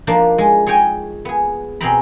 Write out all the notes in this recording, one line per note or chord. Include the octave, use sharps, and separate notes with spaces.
F3 A#3 D4 D#4
G#3
G#4 C#5 D#5 G5 G#5
B3 G#4
B2 C4 G#4 G5 A#5 B5